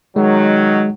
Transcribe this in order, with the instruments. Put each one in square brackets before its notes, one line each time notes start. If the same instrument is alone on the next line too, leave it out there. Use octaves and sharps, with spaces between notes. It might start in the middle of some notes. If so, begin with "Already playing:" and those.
[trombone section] D#3 F#3 [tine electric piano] G#3